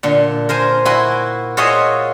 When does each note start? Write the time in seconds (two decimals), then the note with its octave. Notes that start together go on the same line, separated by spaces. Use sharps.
0.03 A#2 D3
0.49 A#4 C5 G#5
0.85 E4 F#4 G#5 C6
1.57 F4 F#4 G#4 C#5 D#5 E5